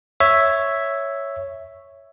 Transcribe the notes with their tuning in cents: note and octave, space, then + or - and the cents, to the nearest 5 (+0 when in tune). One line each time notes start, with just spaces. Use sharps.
C#5 +0 E5 +0